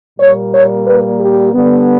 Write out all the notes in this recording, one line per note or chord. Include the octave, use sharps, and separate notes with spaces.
A#2 G3 A#3 C#5
C#5
B4
G4
D3 G3 B3